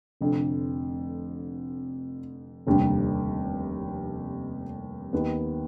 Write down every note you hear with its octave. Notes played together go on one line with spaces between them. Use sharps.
F1 F2 D3
F1 D#2 D3 G3
D#2 D#3 B3